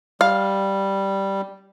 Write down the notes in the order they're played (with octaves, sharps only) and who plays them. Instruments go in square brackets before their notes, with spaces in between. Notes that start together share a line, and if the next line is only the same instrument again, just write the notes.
[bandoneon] G3 [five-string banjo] F5